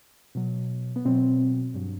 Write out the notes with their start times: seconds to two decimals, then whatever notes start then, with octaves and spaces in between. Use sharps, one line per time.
0.35 B2 F#3
0.96 B3
1.05 B2 F#3 C4
1.74 G2 F#3